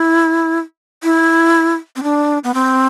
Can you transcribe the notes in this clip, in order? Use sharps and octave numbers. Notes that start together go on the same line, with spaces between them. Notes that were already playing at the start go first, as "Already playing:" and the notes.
Already playing: E4
E4
C4
D4
B3
C4